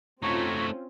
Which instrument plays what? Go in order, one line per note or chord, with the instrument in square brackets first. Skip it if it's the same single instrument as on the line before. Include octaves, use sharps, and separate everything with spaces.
[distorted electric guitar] A3 D#4 [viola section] C4 C#4 F4 [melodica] F#4 C#5